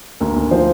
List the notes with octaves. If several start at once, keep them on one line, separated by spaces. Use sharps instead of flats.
D2 A#4
D2
F3 C5